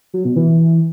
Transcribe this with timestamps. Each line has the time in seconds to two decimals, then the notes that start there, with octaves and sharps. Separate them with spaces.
0.14 F#3
0.25 B2
0.36 E3